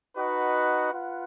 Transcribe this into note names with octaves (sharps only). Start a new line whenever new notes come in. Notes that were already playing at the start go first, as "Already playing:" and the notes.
D#4 F#4 B4 D#5 F#5
F4 B4 F#5